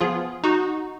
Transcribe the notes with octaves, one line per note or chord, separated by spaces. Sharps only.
F3 B3 F4 G#4
D#4 F#4